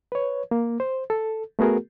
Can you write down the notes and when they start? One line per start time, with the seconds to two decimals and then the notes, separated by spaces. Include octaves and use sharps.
0.12 B4 C#5
0.51 A#3
0.80 C5
1.10 A4
1.59 A3 B3 F#4 G#4 A#4